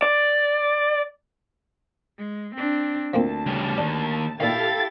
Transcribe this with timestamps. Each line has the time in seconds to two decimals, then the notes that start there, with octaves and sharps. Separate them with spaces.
0.02 D5
2.18 G#3
2.55 C4 D4
3.14 D2 F3 A#3 C4 A5
3.46 C#3 G3
3.78 D#2 D4
4.40 A#2 D#3 E4 G4 A4 F5 A6